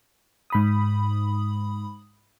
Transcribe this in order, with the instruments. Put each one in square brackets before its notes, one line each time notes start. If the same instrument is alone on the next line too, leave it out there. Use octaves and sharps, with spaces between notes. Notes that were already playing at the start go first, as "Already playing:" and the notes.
[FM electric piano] G#2 B5 D#6